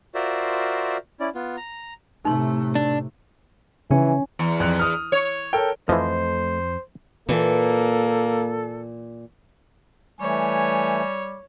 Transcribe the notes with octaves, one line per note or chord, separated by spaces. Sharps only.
F4 F#4 A#4 C5 D5 E5
C#4 E4 D5
B3 F4
A#5
A2 C3 A3 D#4 C6
D4
C#3 E3 C#4
E2
F2 F#6
D#6 F6
C#5
A4 A#4 G5
F2 E3 F3 A3 C5 D#5
A#2 E3 A#3 A4
E3 G3 A3 C#5 G#5